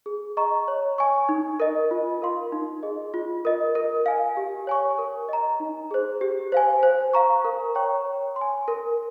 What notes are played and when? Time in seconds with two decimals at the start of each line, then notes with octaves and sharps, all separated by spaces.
0.06 G#4
0.37 D#5 A#5 C#6
0.68 C#5
0.98 G#5 C#6
1.29 D#4
1.60 A#4 D#5
1.91 F4
2.22 A#4 F5 C6
2.52 D#4
2.83 G#4 D#5
3.14 F4
3.45 A#4 D#5
3.75 A#4
4.06 F5 G#5
4.37 G4
4.67 C#5 G#5 C#6
4.98 A#4
5.29 D#5 A#5
5.60 D#4
5.91 G#4 C5
6.21 G4
6.52 C5 F5 G#5
6.83 C5
7.13 F5 A#5 C#6
7.45 A#4
7.75 C#5 G5 A#5 C#6
8.05 C#5
8.36 C6
8.41 G#5
8.68 A#4